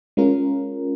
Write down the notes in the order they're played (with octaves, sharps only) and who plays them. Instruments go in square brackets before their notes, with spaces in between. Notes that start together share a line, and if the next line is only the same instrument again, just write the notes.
[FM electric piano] G#3 C#4 F4 A#4